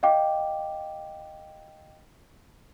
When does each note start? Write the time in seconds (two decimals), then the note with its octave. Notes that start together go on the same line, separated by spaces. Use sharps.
0.03 D#5 F5 G5 D6